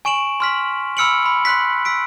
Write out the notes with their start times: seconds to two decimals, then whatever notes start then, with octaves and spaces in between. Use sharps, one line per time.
0.05 G#5 C#6 D7 E7 F#7
0.40 C6 F6 B6
0.97 B5 E6 F6 C#7 D7 F#7
1.23 B5 C6 C#7
1.45 C6 F#6 B6
1.85 E6 B6 D7